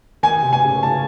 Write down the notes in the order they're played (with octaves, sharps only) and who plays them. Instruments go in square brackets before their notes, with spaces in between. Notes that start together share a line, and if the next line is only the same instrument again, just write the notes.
[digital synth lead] D#3 [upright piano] G#5
[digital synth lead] C3
[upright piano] G#5
[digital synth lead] C#3
[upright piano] A5